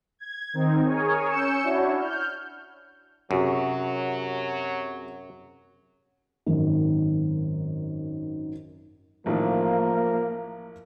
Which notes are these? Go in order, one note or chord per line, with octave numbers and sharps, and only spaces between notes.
G#6
D#3 C4 D#4
G#4 A#4 C#5 G#5
C#4 E6 G6 C#7 E7
D4 E4 F#4 C#5
F6 G6
F#2 C3 F#3 F#4 G#4
G#1 F#2 D#3
A1 A2 D#3 F3 A#3 A#4